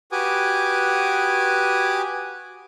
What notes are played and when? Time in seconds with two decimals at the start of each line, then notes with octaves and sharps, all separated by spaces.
0.12 F#4 G4 B4 G#5 D6 D#6